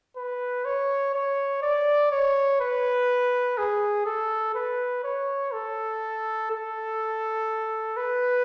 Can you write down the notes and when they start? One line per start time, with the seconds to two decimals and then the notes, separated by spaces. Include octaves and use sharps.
0.16 B4
0.65 C#5
1.14 C#5
1.62 D5
2.11 C#5
2.60 B4
3.58 G#4
4.06 A4
4.55 B4
5.04 C#5
5.53 A4
6.51 A4
7.97 B4